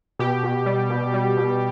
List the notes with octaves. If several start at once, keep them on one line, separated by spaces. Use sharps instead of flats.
B2 G4
B2
G3
B2
G3
B2